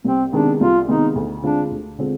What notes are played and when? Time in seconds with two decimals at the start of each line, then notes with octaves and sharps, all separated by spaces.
0.05 C2 C4
0.32 C3 D#3 G#3 B3 D4
0.60 C2 F4
0.88 C3 D#3 G#3 B3 D#4
1.15 D2
1.43 D3 G#3 C4 D4 F4
1.71 D2
1.98 D3 G#3 C4 F4